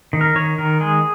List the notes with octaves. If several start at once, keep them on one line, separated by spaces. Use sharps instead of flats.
D#3
A#4
D#3 C#5
D#3 A#4
G#3 G#4